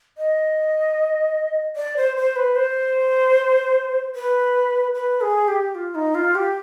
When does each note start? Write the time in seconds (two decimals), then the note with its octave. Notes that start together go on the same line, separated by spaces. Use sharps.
0.18 D#5
1.76 D5
1.97 C5
2.16 C5
2.36 B4
2.56 C5
4.15 B4
4.95 B4
5.21 G#4
5.48 G4
5.75 F4
5.95 D#4
6.15 F4
6.35 G4